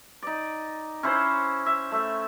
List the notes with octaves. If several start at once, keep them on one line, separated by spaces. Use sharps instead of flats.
D#4 D5
C#4 E4 C5 B5
E5
A3 E5